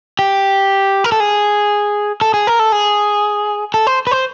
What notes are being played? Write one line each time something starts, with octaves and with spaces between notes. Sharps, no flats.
G4
A#4
A4
G#4
A4
G#4
A#4
A4
G#4
A4
C5
B4
C5